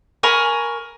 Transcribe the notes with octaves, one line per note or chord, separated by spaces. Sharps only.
A#4 G#5 B5 C#6